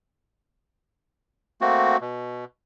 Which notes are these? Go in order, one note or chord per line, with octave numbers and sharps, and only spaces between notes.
A3 A#3 C4 F#4
B2